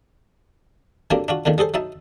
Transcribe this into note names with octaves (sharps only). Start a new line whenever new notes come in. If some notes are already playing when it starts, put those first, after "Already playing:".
D3 F#3 G3 A#3 C4 D4
D4 F4 F#4
E2 A#2 D3 D#3
G3 G#4 A4 C5
F#3 D#4 E5 A5